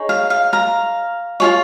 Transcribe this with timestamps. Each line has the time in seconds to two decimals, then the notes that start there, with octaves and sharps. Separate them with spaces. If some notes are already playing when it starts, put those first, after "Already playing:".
Already playing: D#4 G#4 C#5
0.09 F5
0.30 F5
0.53 F5 A#5
1.40 F4 G#4 C#5